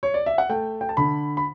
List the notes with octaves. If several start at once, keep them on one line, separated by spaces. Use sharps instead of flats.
C#5
D5
E5
F#5
A3 G5
G5
A5
D3 B5
B5